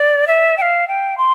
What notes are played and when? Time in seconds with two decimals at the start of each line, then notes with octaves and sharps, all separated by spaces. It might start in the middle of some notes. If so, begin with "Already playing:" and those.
Already playing: D5
0.27 E5
0.57 G5
0.62 F5
0.88 G5
1.18 C6